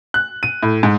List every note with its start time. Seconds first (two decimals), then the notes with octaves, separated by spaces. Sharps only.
0.14 F#6
0.43 D#7
0.63 A2
0.83 G#2